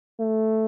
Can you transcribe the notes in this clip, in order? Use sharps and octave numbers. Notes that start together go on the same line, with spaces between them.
A3